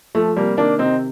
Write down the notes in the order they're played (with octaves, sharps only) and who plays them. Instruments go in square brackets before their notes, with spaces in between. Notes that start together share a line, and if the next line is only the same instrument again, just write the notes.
[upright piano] F3 A3
C3 G3 A#3
D#3 A#3 D4
C3 C4 D#4